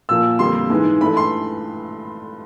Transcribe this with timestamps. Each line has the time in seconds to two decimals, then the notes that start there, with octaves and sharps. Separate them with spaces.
0.09 A#2 F3 A#3 E6
0.39 F2 D3 G3 A#3 C6
0.70 G#2 E3 G#3
1.01 G2 E3 A3 B5
1.17 C6